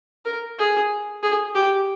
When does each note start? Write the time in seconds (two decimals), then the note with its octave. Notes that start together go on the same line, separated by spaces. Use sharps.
0.25 A#4
0.59 G#4
1.23 G#4
1.55 G4